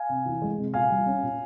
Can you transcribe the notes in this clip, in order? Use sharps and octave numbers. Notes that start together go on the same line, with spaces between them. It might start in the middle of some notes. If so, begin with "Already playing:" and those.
Already playing: F5 G#5
C3
E3
G#3
C3
A#2 F5 G#5
G3
C#4
A#2